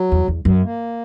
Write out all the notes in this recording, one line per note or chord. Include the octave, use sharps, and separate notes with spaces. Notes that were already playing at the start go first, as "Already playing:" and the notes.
Already playing: F#3
E2
E2
F#2
A#3